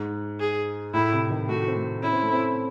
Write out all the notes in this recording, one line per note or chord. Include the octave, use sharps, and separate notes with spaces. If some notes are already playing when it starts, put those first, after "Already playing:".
Already playing: G#2
G#4
A2 E4
C3
D#3
A3 F#4
C4
A3
C#4 E4
C4
A3
C4